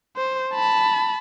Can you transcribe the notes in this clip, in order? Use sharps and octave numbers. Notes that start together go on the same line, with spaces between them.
C5
A5 B5